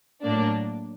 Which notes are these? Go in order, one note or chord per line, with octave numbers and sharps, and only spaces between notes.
A2 F#3 A#3 D4